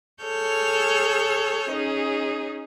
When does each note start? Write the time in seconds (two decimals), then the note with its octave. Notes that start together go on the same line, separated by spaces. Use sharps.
0.22 G#4 A4 C#5 F6 G6
1.70 C#4 D#4 G#4